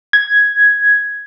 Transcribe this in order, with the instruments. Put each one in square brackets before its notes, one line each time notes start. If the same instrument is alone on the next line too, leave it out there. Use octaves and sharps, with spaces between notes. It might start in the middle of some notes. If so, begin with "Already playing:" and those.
[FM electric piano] G#6